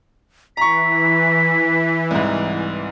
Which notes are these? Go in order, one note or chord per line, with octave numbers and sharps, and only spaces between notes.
E3 A#5 C#6 B6
C2 G#2